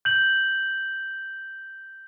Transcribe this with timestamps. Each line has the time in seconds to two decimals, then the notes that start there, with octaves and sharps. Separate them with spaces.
0.05 G6 F#7